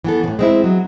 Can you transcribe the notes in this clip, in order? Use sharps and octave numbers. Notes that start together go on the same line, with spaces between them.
E3 B3 A4
A2 C#3
G#3 C4 E4
F#3